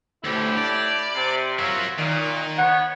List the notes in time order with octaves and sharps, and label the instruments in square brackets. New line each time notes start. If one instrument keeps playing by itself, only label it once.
[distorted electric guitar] D2 [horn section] A2 E4 G4
[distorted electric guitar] D5
[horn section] C3
[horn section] F4 C#5 E5 [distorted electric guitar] F#4 A#4
[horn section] A#2 [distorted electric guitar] D#3
[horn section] B3 C#5 [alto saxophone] F#5